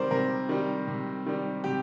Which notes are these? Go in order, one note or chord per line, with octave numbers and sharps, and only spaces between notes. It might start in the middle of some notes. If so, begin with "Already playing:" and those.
Already playing: C3 D#3 G3 A#4 C5 D5
C3 A#4
D#3 G3
C3
D#3 G3
C3 G4